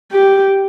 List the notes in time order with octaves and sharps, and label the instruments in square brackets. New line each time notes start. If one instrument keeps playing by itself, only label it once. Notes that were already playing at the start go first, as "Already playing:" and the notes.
[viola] G4